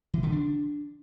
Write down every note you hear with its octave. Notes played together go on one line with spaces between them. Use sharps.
E3
D3
D4